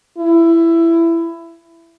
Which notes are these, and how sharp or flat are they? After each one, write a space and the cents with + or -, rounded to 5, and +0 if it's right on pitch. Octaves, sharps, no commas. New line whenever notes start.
E4 +15